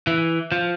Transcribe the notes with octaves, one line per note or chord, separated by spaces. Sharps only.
E3
F3